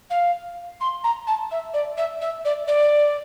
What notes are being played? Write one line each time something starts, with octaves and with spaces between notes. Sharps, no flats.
F5
C6
A#5
A5
E5
D5
E5
E5
D5
D5